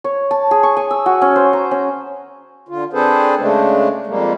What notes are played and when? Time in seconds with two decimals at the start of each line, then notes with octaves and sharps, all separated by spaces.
0.04 C#5
0.31 A5
0.51 G#4
0.63 C#6
0.77 G#5
0.91 E6
1.06 F#4
1.22 C#4
1.36 C5
1.53 A#5
1.71 C#4
2.68 D3 F4
2.93 C4 D4 G#4 A4 B4 C5
3.38 C#3 G#3 A3 D4
4.07 F2 G3 G#3 A#3